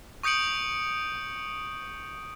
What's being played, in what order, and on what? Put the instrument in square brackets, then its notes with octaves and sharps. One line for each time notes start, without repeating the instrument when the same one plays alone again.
[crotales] C#6 D#6 G6 C#7 D7 F#7